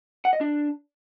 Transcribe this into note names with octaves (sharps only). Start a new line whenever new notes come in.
F#5
D#5
D4